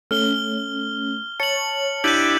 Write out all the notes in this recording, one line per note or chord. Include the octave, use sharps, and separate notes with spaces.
A3 C#4 F6 G7
C#5 A5 C#7 F#7
D4 E4 G4 G6 D#7 F#7